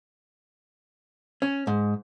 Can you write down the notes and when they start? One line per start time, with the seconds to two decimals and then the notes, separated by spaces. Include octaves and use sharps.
1.42 C#4
1.67 G#2